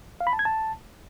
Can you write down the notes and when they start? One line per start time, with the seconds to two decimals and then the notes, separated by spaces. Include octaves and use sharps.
0.21 F5
0.27 B5
0.33 A5
0.39 G#6
0.45 A5